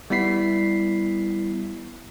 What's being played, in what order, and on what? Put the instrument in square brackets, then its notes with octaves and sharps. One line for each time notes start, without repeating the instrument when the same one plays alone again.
[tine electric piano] G3 B3 E4 B6 C7